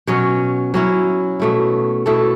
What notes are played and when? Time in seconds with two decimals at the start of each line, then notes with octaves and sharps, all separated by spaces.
0.07 B2 F#3 C#4
0.74 F#3 C#4 E4
1.40 B2 A3 E4
2.06 B2 A3 E4 A4